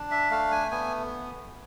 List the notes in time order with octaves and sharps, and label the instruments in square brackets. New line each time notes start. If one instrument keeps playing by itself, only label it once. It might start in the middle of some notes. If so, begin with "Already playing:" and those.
Already playing: [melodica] D4
E5
A3 F5
G#5
B3 G#5